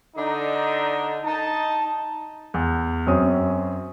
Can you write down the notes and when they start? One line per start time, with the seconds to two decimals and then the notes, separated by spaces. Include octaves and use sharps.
0.16 D3 D4 D#4
1.25 D#4 A5
2.54 E2
3.07 F#2 C4 C#4 D#6